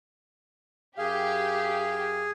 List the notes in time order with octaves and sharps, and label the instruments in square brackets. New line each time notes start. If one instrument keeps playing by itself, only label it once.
[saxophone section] F#2 F5 [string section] G4 [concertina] G#4